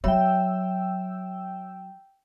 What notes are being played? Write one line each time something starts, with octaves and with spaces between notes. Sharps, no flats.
F#3 C#5 E5 G5 B5 E6